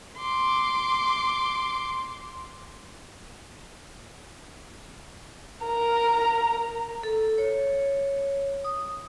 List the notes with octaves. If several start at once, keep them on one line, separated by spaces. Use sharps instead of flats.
C6 D6
A#4 A#5
A4
C#5
D#6